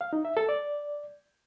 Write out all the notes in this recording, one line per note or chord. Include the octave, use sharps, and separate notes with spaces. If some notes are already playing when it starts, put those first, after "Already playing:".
F5
D#4
E5
A4
D5